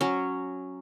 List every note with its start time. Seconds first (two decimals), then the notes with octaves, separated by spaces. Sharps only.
0.01 F#3 C#4